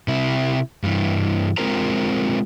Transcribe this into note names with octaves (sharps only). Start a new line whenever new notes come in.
C3 E4
G2 E3
G#3 C4 F4 A#4 C5 A#5